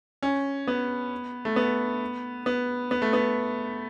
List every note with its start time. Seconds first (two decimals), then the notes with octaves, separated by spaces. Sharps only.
0.22 C#4
0.67 B3
1.45 A3
1.56 B3
2.46 B3
2.91 B3
3.02 A3
3.13 B3